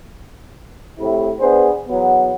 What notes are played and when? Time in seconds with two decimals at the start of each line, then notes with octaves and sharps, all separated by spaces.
0.99 A2 C3 E4
1.40 B3 D4 G#4 B4 C5
1.88 E2 F#3 B3